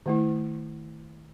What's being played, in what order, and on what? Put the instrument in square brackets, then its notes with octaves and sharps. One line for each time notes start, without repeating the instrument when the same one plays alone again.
[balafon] D#3 A3 E4